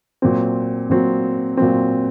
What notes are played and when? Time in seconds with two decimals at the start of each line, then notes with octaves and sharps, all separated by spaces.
0.22 A#2 F#3 C4
0.90 A#2 F#3 C4
1.57 A#2 F#3 C4